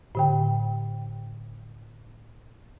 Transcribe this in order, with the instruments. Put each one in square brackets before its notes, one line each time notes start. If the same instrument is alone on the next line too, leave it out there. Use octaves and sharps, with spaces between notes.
[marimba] A2 D3 G5